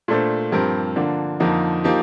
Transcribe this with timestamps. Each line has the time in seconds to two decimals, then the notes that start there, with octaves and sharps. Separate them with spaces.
0.08 A#2 A3 D4 A4 C5
0.52 G2 F3 C4 G4 A#4
0.96 D3 F3 A#3 D4
1.40 F2 D3 F3 A#3 D#4
1.84 F3 A#3 D#4 G4